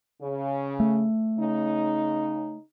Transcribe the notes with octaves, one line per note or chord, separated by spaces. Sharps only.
C#3
A3
C#3 D#4